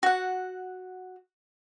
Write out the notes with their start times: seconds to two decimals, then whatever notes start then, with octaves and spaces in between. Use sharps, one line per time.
0.03 F#4 F#5